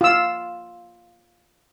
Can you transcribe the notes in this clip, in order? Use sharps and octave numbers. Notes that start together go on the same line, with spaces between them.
F4 E6